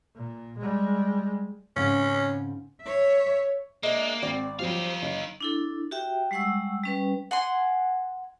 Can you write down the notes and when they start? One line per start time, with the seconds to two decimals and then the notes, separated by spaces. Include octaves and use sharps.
0.15 A#2
0.58 G3 G#3
1.76 G#2 C#3 C4 C#4
2.82 C#5 E5
3.83 G#3 A#3 D4 E5
4.23 G#1 C4 D5
4.59 F2 F#3 G3 D#4 C5 F5
5.02 F#1 D#5
5.41 D4 E4 A4
5.91 F#4 G4 E5 G5
6.31 G3 G#3 F#5 C#6 E6
6.84 G3 C#4 B4
7.31 F#5 G#5 C6